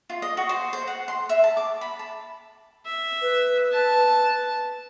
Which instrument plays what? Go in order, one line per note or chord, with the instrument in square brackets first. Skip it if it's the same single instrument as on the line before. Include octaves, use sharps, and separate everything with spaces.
[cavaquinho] F4
D#5
F#4
C5
C5
F#5
C6
E5
A5
D6
B5
A5
[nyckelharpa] E5
[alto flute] B4
[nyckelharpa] A5